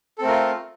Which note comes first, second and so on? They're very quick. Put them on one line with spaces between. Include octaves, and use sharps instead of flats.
A4 C4 A3 A#4 F4